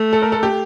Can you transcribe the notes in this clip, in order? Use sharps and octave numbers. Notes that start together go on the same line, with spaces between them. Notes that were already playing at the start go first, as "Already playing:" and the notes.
Already playing: A3
A4
A#4
A4
G4